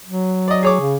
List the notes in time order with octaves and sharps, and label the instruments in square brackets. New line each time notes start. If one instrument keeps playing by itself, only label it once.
[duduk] F#3
[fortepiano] D5 D#5
G#4 C#5 D6
[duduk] C#3